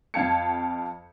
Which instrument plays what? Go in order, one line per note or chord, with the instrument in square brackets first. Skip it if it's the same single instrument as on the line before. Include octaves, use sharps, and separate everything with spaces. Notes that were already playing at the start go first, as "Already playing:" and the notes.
[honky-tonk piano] F2 F5 G5 A5 G#6 C#7